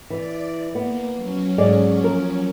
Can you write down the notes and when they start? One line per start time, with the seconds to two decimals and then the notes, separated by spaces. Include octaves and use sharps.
0.10 E3 D5
0.75 A#3 B3
1.17 F#3 C#4
1.58 G#2 G#4 D5
2.02 F3 A#3 A#4